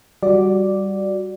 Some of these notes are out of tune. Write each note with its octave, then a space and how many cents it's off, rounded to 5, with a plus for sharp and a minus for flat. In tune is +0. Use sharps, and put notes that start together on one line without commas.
G3 +0 F#4 +0 D5 +0